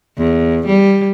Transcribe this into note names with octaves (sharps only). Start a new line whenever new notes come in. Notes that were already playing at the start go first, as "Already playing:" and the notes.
E2
G3